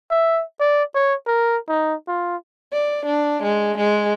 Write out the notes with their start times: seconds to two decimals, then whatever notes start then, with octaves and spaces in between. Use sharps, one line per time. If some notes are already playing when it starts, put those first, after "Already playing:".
0.11 E5
0.60 D5
0.95 C#5
1.26 A#4
1.68 D#4
2.08 F4
2.73 D5
3.05 D4
3.43 G#3
3.77 G#3